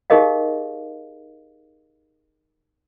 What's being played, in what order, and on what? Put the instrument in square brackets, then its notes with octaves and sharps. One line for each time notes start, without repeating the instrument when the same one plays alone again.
[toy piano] D#4 G4 G#4 A#4 D#5 F5